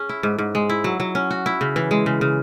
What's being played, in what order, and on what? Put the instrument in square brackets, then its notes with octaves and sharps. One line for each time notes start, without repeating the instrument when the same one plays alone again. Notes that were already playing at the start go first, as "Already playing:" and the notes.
Already playing: [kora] C#4 G#4
E4
G#2
G#2
G#3
E4
F#3
F#3
C#4
F#4
E4
C#3
E3
G#3
C#3
C#3